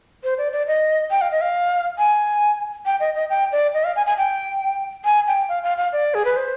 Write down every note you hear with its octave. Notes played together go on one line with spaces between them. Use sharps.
C5
D5
D5
D#5
G5
F5
D#5
F5
G#5
G5
D#5
D#5
G5
D5
D#5
F5
G#5
G#5
G5
G#5
G5
F5
F5
F5
D5
G#4
B4
C5